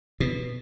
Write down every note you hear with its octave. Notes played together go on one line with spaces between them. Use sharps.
B2